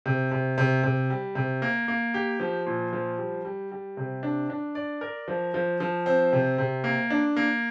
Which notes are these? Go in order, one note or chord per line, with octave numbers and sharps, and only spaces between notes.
C3
C3
C3
C3
G3
C3
A#3
A#3
G4
F3
A#2
F3
G3
G3
G3
C3
D4
D4
D5
A#4
F3
F3
F3
C4
C3
C3
A#3
D4
A#3